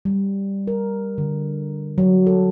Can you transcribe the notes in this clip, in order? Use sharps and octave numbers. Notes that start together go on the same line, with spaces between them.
G3
A#4
D3
F#3
A4